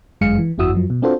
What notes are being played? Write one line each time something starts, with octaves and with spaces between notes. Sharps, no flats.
G1 F#2 G#3 G#4 F5 C#7
E3
G1 F2 E4 F#4 D#6 E6
F#2 F3 F#3
B2
C4 D4 F4 F#4 A4 C5